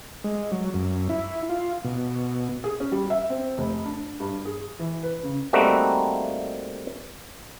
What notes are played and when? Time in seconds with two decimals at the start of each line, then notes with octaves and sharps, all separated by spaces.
0.24 G#3
0.52 F#3
0.74 F#2
1.09 E4
1.49 F4
1.84 B2
2.64 G#4
2.80 C#4
2.92 G3
3.10 E5
3.30 C4
3.58 F1
3.85 D4
4.20 G2
4.45 G#4
4.79 E3
5.03 B4
5.23 C#3
5.53 G3 A3 A#3 C4 D#4 F#4